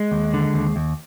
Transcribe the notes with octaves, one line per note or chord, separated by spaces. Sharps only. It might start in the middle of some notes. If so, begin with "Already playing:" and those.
Already playing: G#3
D#2
D3
D#2
D#2